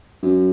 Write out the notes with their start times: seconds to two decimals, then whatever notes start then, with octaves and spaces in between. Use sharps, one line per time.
0.22 F#2